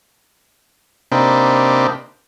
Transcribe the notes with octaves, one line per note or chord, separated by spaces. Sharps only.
C3 A#3 C4 D4 D#4 B5